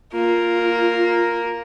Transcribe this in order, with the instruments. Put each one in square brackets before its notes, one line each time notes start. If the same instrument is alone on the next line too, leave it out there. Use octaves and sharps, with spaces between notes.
[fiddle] A#3 [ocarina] F4